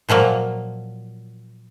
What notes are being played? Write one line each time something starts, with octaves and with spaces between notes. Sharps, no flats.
A#2 F3 F#3 A#3